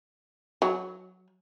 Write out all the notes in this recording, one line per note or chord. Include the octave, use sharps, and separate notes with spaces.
F#3